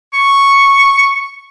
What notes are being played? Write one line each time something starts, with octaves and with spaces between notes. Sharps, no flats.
C#6